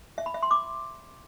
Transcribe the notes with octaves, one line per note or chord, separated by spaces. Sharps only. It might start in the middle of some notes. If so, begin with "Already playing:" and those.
E5
B5
E5
C6
D6